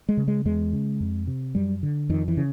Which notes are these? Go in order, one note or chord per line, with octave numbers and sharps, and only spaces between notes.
G#3
C#3
G#3
E2 G#3
C#3
F2
C3
F#2 G3
D3
F2 D#3
E3
C#3